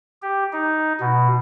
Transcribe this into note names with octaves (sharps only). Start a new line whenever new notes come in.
G4
D#4
B2